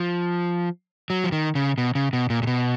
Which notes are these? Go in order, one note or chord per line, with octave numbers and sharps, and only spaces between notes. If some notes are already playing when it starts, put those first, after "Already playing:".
Already playing: F3
F#3
F3
D#3
C#3
B2
C#3
B2
A#2
A#2
B2